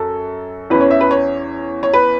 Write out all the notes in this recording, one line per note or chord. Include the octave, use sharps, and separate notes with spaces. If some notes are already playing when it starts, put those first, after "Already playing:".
Already playing: F#2 A4
E2 E3 C#4 B4
C#5
E5
B4
C#5
C#5
B4